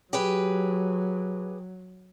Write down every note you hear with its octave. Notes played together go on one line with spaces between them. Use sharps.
F#3 G4 G#4 B4